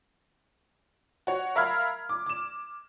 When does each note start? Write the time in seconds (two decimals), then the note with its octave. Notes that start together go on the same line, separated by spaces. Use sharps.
1.27 F#4 C#5
1.55 A#4 E5 F5 B5 F6 G#6
2.09 D6
2.26 D6 E7